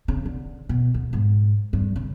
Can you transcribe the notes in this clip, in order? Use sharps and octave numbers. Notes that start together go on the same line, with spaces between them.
C#3
D3
B2
D2
G#2
G2
C#3